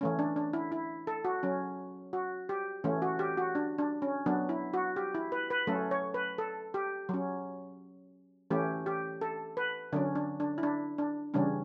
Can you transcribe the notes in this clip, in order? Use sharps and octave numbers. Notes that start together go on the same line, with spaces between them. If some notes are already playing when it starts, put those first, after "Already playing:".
E3 A3 C#4
D4
D4
E4
E4
A4
F#4
F#3 C#4
F#4
G4
E3 A3 C#4
F#4
G4
F#4
D4
D4
C#4
F#3 B3 D4
E4
F#4
G4
E4
B4
B4
F#3 A3 C#4 A4
C#5
B4
A4
G4
F#3 C#4
E3 A3 C#4 G4
G4
A4
B4
D3 F#3 C#4 D4
D4
D4
E4
D4
D4
C#3 E3 G3 C#4 D4